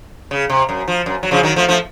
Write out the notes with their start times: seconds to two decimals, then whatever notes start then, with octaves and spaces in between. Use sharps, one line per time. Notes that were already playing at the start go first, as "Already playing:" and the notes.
0.31 C#3
0.50 C3
0.69 F#2
0.88 F3
1.06 F#2
1.23 F#3
1.31 C#3 F3
1.43 D#3 F#3
1.56 F3 A3
1.68 F3 A3